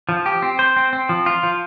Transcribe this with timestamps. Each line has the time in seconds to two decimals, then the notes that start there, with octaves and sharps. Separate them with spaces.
0.09 F3
0.26 G4
0.42 C4
0.59 C5
0.77 C4
0.93 C4
1.09 F3
1.26 F4
1.43 F3